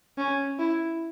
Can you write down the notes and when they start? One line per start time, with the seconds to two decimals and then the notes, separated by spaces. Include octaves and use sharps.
0.18 C#4
0.59 E4